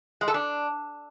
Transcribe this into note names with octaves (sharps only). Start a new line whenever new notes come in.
G#3
A4
D4